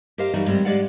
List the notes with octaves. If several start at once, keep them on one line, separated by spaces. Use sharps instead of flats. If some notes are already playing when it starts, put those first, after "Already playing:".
G4 A#4 C5 D#5 F5
E3 G3 D#4 F#4
D2 G#2 G3 G#3 C4
G#3 G4 D5 F5 F#5